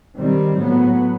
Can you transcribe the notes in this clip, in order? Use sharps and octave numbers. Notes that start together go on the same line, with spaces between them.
D#3 G3 C4
A2 F#3 B3